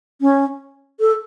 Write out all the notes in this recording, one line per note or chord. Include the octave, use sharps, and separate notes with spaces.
C#4
A4